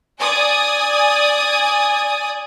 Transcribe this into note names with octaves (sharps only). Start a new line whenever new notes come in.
D5 G#5 D#6